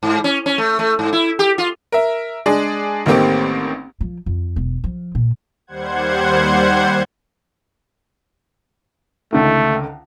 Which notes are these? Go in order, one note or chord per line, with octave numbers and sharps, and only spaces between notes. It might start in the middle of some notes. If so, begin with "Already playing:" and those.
G#2
C#4
C#4
A3
A3
G#2
E4
G4
F4
A#4 E5
G#3 D4 G#4
A1 D#3 A3 A#3 C4 G4
F3
F2
E1
F3
A#2
D#2 G3 C5 F#5 G#6
C#2 D3 D#3 A3